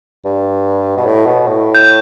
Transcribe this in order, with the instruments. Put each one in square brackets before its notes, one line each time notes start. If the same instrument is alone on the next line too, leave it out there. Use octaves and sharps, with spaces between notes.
[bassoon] G2
B2
A2
B2
A2
[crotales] G6